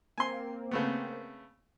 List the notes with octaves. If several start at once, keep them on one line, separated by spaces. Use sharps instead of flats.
A#3 C4 G#5 C6
C#3 A3 B3